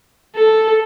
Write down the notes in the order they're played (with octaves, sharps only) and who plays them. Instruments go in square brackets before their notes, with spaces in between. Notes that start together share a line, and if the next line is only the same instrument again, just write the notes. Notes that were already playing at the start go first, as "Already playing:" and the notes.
[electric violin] A4